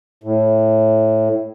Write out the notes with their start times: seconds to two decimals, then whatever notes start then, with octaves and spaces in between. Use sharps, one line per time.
0.24 A2